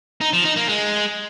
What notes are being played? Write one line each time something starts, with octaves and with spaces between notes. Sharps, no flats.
D#4
F3
D#4
A#3
G#3